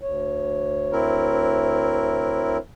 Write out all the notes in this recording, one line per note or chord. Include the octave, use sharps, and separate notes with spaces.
D2 C#5
C4 E4 A#4